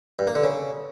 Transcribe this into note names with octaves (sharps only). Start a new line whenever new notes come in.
G2
A#3
D3
C#3